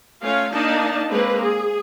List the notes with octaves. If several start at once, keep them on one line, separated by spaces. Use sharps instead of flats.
A3 C#4 F4 C#5 F5
A#3 D4 D#4 D5 D#5 A5
G#3 A#3 C4 B4
G#4